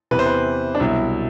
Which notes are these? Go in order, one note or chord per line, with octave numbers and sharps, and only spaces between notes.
E2 C3 E3 B4
C5
B4
D4
C2 B2 F#3 E4